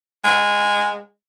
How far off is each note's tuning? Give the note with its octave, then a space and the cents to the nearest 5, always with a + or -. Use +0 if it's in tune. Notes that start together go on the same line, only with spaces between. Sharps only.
G#3 -15